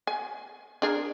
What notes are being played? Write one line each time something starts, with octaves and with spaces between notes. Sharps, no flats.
G#5
D4 G#4 A#4